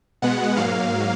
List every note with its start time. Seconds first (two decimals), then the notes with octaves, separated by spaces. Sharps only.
0.22 B2 G#3 B3 F#5
0.56 G#2 F#3 A#3 F5